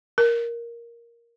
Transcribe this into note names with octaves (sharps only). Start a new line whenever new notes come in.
A#4